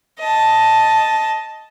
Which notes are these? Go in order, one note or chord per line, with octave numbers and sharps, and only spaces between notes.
D#5 A5